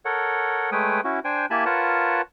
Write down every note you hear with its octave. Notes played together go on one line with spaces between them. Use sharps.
A4 A#4 C#5 F#5
G#3 A3 B4 C#5 G5 D#6
C#4 E4 F#4
D4 C5 G5 G#5
A#3 E4 G4 G#5 A5 B5
F4 A#4 B4 C#5 F#5 A5